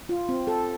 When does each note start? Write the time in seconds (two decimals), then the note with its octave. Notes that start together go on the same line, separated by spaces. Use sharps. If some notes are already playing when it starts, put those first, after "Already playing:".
0.09 F4
0.29 C4
0.47 A4